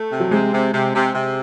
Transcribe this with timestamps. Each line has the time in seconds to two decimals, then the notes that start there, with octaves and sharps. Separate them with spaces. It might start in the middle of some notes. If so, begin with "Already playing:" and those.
Already playing: A3
0.11 C3
0.20 F#3
0.31 C3 G#3
0.52 C3
0.72 C3
0.94 C3
1.14 C3